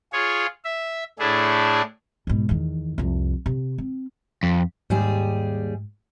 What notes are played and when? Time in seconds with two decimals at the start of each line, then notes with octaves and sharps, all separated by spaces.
0.13 F4 G#4 C#5
0.65 E5
1.19 A2 A3 D4 E4 G#4
2.27 G#2 B2
2.49 E2 D#3
2.98 C2 F2
3.46 C3
3.78 C4
4.43 F2
4.90 D#2 G#2 G3 G#4